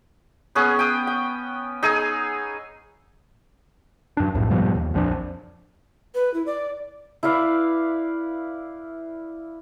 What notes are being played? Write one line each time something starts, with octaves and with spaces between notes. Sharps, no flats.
B3 C#4 G#4
G5 D#6
G5
D#4 G#4 G#5 E6
F#2 D4
B1 F2 A2
G#2 B2 F3 G3
D#2
A#1 F2 F3 D4
B4
E4
D5
E4 B4 D5 F5